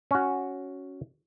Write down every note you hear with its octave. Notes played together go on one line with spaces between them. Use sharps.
C#4 F#4